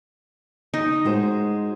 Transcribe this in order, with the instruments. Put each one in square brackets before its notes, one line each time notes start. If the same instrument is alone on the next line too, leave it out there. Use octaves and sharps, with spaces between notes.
[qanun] D#4
[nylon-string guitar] G#3 F#4 C5